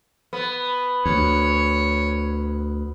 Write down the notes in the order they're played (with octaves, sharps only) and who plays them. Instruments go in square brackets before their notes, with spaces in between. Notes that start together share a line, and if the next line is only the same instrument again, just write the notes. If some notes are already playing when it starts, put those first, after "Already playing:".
[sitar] B3
[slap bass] D2 [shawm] C#5